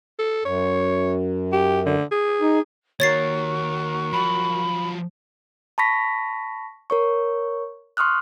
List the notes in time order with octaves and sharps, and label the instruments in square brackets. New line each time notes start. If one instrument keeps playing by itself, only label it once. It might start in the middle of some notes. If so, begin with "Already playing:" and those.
[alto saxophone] A4
[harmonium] F#2 [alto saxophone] C#5
[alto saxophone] G4
D3
G#4
[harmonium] D#4
[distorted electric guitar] D#2 D#3 [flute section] F#4 A#4 C#6 [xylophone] C#5 A6 C7
[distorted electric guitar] F3 F#3 [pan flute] B5
[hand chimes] A5 B5 C#6 A#6 B6
A#4 C#5 C#6
C6 C#6 D#6 F6 F#6